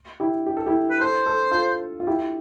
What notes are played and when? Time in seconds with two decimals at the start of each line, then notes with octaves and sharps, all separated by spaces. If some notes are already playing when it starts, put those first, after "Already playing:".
0.20 E4 G4
0.46 G4
0.57 A4
0.66 E4 G4
0.90 B4
1.01 A4 C5
1.26 A4
1.51 F4 A4
2.00 F4
2.07 E4 G4